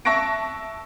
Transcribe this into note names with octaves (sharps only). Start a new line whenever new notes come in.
E5 A5 C#6 F#6 A#6 D7